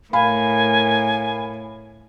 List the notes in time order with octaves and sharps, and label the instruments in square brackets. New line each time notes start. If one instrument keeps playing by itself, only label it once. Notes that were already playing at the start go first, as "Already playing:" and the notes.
[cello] A2 [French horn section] A#4 [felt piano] F5 B5 [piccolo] G#5